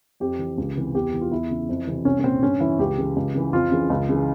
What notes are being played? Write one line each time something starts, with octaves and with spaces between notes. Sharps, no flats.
F2 G4
E3
C#2
C3 E3
E2 G4
E3
F4
E2 E4
C#3 E3
F2
C3 E3
C2 C#4
C#4
A#2 C4
G2 C#4
E3 E4
C#2 G4
C#3 E3
C#2
C#3 E3
F2 F4
C#3 E3
C#2
C#3 E3